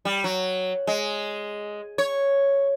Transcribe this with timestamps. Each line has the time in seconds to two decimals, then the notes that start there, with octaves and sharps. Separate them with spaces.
0.05 G3
0.24 F#3
0.87 G#3
1.98 C#5